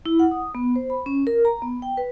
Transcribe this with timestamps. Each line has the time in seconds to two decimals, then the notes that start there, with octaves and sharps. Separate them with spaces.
0.06 E4
0.19 F#5
0.31 D#6
0.55 B3
0.76 C5
0.90 B5
1.06 C#4
1.27 A#4
1.45 A#5
1.62 B3
1.82 G5
1.97 B4